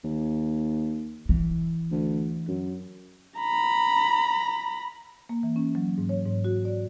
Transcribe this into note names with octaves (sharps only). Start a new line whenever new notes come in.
D#2
E3
D2
F#2
A#5 B5
A#3
E3
C#4
F#3
G#2
C#5
G#2
F#4
D5